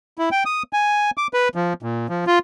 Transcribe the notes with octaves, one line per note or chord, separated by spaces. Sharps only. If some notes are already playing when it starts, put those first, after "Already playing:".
E4
G5
D#6
G#5
D6
B4
F3
A#2
F3
F4